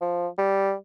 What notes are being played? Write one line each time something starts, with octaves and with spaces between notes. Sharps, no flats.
F3
G3